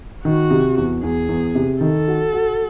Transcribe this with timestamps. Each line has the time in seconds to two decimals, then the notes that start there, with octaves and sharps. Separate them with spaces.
0.25 D#3 F#4
0.51 C3
0.77 E2
1.03 E2 G#4
1.29 E2
1.55 C3
1.81 D#3 A4
2.08 F#4
2.33 F#4